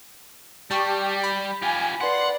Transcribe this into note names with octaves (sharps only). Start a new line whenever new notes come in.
G3 G4 A5 C#6
B5
F4 G4 G#5
B4 D5 F#5 C6